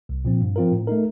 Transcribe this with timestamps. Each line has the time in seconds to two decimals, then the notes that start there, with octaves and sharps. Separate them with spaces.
0.09 C2
0.25 A#2 F3 C4
0.41 G2
0.56 F3 C4 F4 A#4
0.71 A2
0.87 A3 D#4 A#4